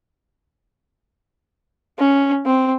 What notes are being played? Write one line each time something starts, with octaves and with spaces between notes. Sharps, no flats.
C#4
C4